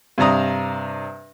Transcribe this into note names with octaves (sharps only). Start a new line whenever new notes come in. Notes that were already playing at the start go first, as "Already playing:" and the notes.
G2 C3 D4 A#5 D#6